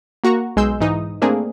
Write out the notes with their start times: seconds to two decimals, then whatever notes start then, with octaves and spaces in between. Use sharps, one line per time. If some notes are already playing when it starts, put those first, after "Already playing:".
0.24 A#3 F#4 A#5 C#6
0.57 B1 G#3 G#4 C6 E6 G6
0.81 G#2 E3 D#4 D#6
1.22 A3 A#3 C4 D4 G#4